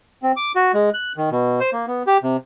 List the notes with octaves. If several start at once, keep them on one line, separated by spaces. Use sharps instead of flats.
C4
D6
F#4
G#3
F#6
D#3
B2
C5
A#3
B3
G4
C3